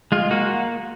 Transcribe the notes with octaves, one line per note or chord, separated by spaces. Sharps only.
G#3 F4
A#3 F#4